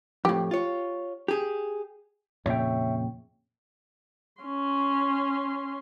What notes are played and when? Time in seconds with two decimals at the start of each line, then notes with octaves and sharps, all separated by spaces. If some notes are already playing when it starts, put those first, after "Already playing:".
0.25 F2 A2 G4
0.51 F4 C#5
1.28 G4 G#4
2.46 F2 A#2 C#3 C#5 E5 G5
4.42 C#4 C6